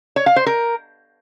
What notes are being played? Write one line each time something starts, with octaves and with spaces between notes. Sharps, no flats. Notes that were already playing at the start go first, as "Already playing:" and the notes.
C#5
F5
C5
A#4